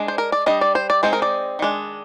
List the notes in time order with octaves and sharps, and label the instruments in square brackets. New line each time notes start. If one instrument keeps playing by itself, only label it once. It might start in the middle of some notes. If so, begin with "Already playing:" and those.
Already playing: [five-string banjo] G#3 D4
C5
A#4
D5
G3 D4 D#5
D5
C5
D5
G#3 C4 D#4 C5
A#4
D5
D#3 G#3 D4